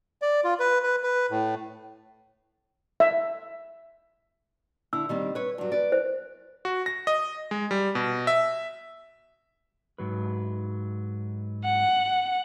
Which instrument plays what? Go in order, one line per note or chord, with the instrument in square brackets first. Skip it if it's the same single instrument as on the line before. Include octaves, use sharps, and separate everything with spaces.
[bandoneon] D5
F4
B4
B4
B4
A2
[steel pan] E5
[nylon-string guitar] D3 E4 [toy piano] E6
[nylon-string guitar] D#3 G3 C4
B4 C#5
G2 F#3
B4 D5
[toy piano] C5
[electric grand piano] F#4
A#6
D#5
G#3
G3
B2
E5
[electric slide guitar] G#2 F#3 B4
[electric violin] F#5